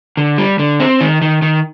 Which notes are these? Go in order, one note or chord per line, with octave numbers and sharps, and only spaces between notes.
D3
G3
D3
C4
D#3
D#3
D#3